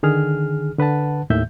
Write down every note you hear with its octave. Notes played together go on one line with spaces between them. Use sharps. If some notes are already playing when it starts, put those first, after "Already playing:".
D3 D#3 G#4 F6
D3 B4 F#5 A5
D#2 A2 D#3 E5 G6